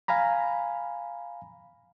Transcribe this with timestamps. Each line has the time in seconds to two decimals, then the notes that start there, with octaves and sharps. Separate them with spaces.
0.08 F5 G#5 A#5 B5